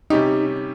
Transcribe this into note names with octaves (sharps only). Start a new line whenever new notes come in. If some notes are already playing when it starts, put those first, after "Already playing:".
C3 G3 C#4 D#4 G4